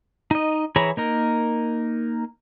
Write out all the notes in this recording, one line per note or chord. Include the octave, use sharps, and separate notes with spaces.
D#4 D#5
E3 E4 G#4 C#5 A#5
A#3 D#4 A#4